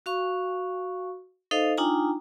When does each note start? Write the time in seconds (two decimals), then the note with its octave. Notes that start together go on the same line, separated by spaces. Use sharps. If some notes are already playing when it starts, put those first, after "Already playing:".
0.06 F#4 F5 C#6
1.51 D#4 A4 C5 D#5 F5
1.78 D4 D#4 F4 G5 G#5 A#5